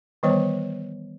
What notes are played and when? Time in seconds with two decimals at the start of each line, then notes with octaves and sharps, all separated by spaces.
0.23 D#3 E3 G3 B3 C5 C#5